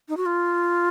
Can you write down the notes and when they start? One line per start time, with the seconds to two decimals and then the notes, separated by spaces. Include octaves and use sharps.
0.09 D#4
0.17 F#4
0.26 F4